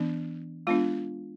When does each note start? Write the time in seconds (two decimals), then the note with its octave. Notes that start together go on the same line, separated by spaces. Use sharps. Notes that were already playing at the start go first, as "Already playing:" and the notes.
Already playing: E3 B3 D4
0.67 G#3 B3 D4 F4